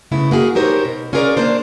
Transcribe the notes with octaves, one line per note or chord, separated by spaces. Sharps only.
C#3 A3 B3 E4
A#3 F#4 G#4
D#4 G4 A#4 C5 C#5
B2
C#4 F4 G#4 A#4 C#5 D5
A#3 D4 C5